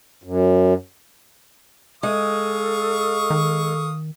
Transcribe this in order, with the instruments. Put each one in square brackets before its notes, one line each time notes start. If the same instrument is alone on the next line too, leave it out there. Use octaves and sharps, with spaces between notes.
[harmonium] F#2
[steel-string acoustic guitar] G#3 [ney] A4 [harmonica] F5 C#6 D#6
[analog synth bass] D#3